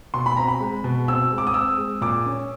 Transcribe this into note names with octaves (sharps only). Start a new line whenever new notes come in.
B2 C6
B5
C4 A#5
B5
G#3
B2
C4 E6
G#3
D6
D#6
C4 E6
G#3
A#2 D6
C#4